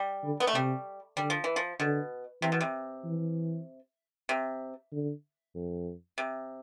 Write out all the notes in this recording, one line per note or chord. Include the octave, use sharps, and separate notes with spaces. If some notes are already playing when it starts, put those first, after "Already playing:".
Already playing: G3
D3
B3
A3
C3 G3
D3 G3
F3
E3
F3
B2 D3
C3 E3
B2
C3
E3
C3
D3
F2
C3